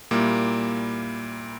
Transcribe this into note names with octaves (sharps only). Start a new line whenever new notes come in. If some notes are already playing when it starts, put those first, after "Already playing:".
A#2 G3 A#3 E4